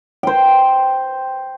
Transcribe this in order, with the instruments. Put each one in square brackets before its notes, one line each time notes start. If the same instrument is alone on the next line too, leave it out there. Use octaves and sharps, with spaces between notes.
[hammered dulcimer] C5 G5